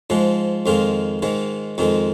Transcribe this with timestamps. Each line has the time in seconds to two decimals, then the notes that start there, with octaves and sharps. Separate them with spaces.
0.10 G#2 F3 G#3
0.66 F2 D#3 G#3 F4
1.22 G#2 D#3 G#3
1.78 F2 D#3 G#3